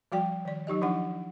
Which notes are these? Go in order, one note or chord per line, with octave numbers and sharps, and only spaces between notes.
F3 G3 F#4 D5 G5
D#3 D5
F#3 D#4 G4 D#5
F3 D4 E4 F#5